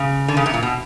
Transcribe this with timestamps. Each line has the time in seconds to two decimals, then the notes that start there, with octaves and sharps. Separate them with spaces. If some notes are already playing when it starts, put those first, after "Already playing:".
Already playing: C#3
0.28 D3
0.37 C#3
0.46 C3
0.54 A#2
0.63 B2